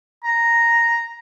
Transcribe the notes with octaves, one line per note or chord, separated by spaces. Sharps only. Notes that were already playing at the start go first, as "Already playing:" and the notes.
A#5